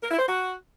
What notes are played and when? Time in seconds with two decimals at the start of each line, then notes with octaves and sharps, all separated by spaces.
0.03 A#4
0.11 E4
0.19 C5
0.27 F#4